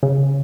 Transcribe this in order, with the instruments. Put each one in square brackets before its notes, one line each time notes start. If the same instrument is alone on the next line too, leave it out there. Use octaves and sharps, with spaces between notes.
[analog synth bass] C#3